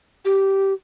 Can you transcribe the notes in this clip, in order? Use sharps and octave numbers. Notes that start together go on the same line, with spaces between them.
G4